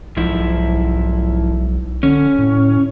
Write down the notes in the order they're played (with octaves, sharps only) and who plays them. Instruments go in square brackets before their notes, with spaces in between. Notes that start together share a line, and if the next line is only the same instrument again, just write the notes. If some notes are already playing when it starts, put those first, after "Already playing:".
[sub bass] B1 [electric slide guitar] G#2 F3 E4
[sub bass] D3 [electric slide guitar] C#4
[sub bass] A2